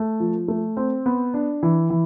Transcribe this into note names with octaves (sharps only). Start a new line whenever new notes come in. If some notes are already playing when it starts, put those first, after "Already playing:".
Already playing: A3
F3
A3
C4
B3
D4
E3
E3